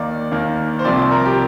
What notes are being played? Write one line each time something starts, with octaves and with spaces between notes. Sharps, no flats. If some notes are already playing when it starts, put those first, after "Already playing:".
Already playing: D#2 D#3 A#3 D5
D#2 D#3 A#3
C5
C2 C3 F3 C4 D5
A#4
G4